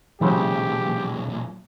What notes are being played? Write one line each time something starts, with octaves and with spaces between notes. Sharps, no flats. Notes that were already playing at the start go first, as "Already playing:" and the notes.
B1 A#2 C#3 E3 F#3 G#3 C4 G4